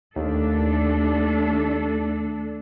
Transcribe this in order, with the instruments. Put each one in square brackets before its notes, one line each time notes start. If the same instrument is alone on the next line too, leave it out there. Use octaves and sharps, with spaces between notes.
[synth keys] D#2 [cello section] A3 D4 A4